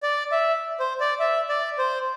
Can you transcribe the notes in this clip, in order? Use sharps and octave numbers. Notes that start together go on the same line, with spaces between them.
D5
E5
C5
D5
E5
D5
C5